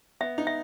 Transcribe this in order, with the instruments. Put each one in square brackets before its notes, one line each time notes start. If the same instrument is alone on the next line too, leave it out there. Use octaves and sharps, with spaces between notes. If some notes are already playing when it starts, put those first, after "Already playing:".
[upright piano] B3 [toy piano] E5
[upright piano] D#4
[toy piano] E5